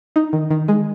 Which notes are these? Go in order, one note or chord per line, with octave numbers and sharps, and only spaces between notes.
D#4
D#3
D#3
G#3